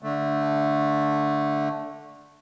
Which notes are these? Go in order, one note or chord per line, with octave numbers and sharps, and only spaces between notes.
D3 A3